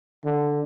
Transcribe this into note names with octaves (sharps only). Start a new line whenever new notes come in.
D3